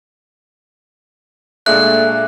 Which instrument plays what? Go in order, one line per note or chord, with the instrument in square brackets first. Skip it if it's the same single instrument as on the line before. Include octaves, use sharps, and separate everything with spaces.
[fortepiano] A#2 G#3 D4 [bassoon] A3 [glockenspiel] F#6